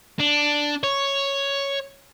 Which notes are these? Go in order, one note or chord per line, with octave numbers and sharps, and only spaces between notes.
D4
C#5